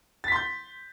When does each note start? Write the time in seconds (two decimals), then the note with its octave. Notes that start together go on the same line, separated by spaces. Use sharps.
0.24 A6
0.28 B6
0.32 C6
0.36 G6